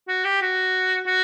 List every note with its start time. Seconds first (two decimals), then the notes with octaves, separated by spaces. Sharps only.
0.08 F#4
0.25 G4
0.42 F#4
1.07 F#4